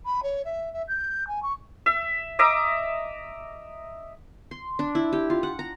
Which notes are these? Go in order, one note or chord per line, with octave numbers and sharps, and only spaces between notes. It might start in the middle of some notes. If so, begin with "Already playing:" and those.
B5
C#5
E5
E5
G6
G#5
C#6
E5
D#5 E5 A#5 D6
C6
D4
E4
G4
F4
F#5
A#5